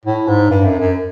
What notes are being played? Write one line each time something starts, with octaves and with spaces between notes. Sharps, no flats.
A2
G#2
G2
F#2
F#2